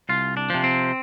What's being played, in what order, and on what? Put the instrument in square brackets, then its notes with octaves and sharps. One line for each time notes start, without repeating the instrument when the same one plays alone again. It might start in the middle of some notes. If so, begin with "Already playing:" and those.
[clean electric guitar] C2 F4
D4
C3 F3
C4